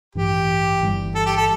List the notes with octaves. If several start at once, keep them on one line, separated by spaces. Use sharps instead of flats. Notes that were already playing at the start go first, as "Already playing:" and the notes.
A1 G2 E3 G4
G1 G2 E3 G3
A4
G4
A4